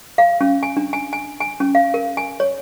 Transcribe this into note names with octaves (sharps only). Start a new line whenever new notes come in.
F5
C#4
G#5
D4
G#5
G#5
G#5
C#4
F5
A#4
G#5
C#5